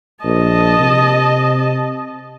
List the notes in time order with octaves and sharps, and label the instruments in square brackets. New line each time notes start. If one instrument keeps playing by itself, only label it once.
[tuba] A#1 [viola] D#5 A5
[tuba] C3